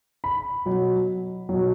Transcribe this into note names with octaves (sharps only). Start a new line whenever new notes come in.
B5
B2 F#3
B2 F#3